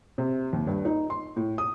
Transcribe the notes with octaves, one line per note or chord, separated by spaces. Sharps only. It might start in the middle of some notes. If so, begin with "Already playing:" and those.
C3
D#2
G2
D#4
C6
A2
D#6